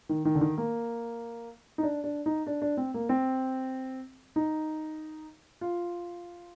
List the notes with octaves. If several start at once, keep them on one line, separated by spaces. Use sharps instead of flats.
D#3
D#3
D3
D#3
A#3
D#4
D4
D4
D#4
D4
D4
C4
A#3
C4
D#4
F4